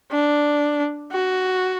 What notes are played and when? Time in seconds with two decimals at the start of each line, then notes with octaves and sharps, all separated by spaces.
0.11 D4
1.13 F#4